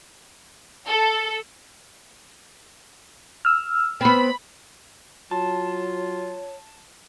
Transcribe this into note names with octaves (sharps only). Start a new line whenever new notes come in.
A4
E6 F6
B3 C4 B5
F#3 F4 C#5 A5